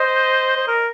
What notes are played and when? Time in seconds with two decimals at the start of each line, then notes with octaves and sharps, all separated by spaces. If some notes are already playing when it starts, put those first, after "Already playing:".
Already playing: C5 D#5
0.57 C5
0.68 A#4